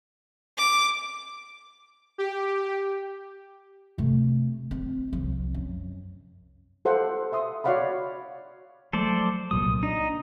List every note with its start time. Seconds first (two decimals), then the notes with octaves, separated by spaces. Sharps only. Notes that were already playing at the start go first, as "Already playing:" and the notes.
0.58 D6
2.18 G4
3.98 C3 A3
4.71 C4
5.13 C2 F3
5.54 F#2
6.85 G4 A4 C5 F5 F#5
7.32 E5 C6 D#6
7.64 F#4 C#5 D5 F5 F#5 B5
8.93 F3 F#3 A3 A4 C5 D5
9.51 C2 A#2 F#3 D#6
9.83 D4 D#4